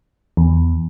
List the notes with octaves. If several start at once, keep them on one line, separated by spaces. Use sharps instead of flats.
E2